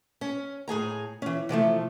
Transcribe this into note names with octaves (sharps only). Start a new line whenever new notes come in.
C#4
A2 G#4 G#5 A#5
E3 C#4
C3 E3 F3 A3